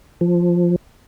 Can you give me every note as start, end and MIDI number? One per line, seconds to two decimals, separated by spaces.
0.21 0.76 53